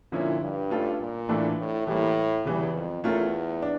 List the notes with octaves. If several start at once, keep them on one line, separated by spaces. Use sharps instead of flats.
A#2 D3 F3 C#4 E4
G2
A3 C#4 F4 A4
A#2
A2 E3 A3 D4 A4
A2
A2 E3 G3 A#3
E2 C#3 E3 G3
F2
E2 A3 C#4 F4 A#4
D4